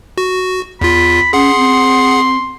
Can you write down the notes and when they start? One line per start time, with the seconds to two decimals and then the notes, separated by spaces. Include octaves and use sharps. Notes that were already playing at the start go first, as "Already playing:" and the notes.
0.18 F#4
0.81 E2 F4 B5
1.33 C#4 G#4 F#5 C6
1.57 C4